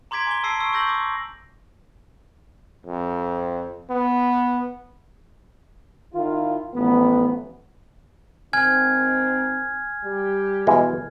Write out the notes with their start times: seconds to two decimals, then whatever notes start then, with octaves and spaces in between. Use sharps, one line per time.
0.11 A#5 C6 D6 G#6 B6 D7
0.27 G#5 C6 D6 G#6 G7
0.44 A5 E6 A#6 C7 D7
0.60 C6 C#6 E6 C7 D7
0.73 C#6 E6 G6 A#6 F#7
0.87 C#6 D6
2.86 F2
3.90 B3
6.14 D#3 E4 F4
6.75 A1 F3 B3
8.53 G#2 D#3 C4 G#5 F6 G#6
10.05 G3 G4
10.67 B2 E3 G#3